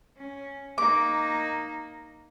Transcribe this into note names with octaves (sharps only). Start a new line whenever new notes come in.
C#4
A#3 D#4 D6